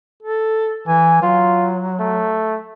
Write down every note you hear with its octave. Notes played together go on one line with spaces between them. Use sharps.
A4
E3 G#5
F#3 F4
A3